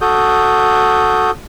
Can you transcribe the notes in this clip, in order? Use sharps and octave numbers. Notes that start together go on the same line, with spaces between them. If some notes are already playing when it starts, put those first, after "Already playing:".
F#4 A4 D#6 G6